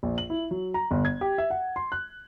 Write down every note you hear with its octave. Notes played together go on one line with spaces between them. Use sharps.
A#1
F#7
E4
F#3
A#5
G1
G#6
G4
E5
F#5
C6
F#6